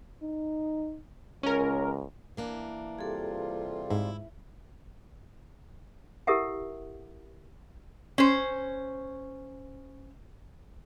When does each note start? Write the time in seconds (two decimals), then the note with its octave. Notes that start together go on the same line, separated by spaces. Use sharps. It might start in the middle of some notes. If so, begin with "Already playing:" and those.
0.22 D#4
1.43 C#2 C#4 A#4
2.37 E3 A#3 D4
2.99 C3 G3 F4 G#4 A4
3.90 G#2 E4
6.27 E4 G4 A4 A#4 E5 F#5
8.18 C#4 C5